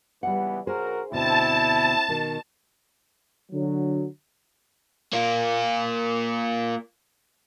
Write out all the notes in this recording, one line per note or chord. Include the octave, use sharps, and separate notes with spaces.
C#2 E3 G3 B3 F#5
B1 F#4 G#4 A#4 C5
D2 B2 C4 E4 A5
B2 D#3
D3 F#3
A#3 F4